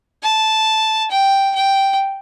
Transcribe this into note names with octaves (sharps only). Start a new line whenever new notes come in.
A5
G5
G5